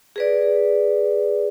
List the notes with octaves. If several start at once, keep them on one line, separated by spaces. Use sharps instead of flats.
G#4 B4 D5